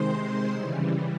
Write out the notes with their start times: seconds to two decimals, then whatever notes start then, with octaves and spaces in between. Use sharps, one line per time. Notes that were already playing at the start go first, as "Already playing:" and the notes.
Already playing: C3 D#3 G#3 C5 C6
0.52 C#3 E3 G3